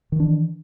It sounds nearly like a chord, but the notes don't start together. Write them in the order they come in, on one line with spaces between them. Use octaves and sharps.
D#3 E3 D4